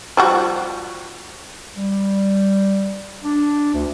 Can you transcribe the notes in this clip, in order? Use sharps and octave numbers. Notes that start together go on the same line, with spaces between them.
F3 G3 F#4
G3
D4
D2